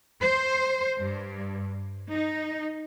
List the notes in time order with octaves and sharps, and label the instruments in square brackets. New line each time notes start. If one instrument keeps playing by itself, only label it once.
[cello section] C5
G2
D#4